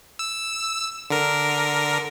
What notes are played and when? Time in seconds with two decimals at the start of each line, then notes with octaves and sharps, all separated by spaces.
0.19 E6
1.10 D3 A#4